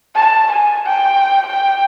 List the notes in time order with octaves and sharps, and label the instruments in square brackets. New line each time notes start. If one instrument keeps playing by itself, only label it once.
[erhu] A5
G#5
G5
G5